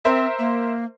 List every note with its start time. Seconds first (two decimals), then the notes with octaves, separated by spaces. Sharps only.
0.05 C4 A#4 C5 E5
0.39 A#3